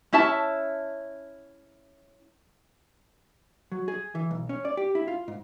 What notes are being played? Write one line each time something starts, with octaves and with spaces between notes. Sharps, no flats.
C#4 E4 E5 A5
F#3
G#4
E3
B1
C#4
D5
G4
E4
F4
G#2